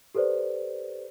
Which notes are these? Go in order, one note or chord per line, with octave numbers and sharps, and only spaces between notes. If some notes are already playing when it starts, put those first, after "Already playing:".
G4 A4 B4 C5 D5